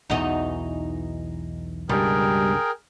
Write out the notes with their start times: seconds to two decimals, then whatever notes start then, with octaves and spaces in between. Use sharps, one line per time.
0.10 B1 E2 E3 D#4 F#4 D#5
1.89 C#2 G2 B2 G3 G#4 A#4 G5